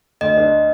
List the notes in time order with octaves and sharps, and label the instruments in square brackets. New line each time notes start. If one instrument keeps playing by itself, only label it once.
[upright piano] D2 [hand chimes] D#5
[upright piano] D4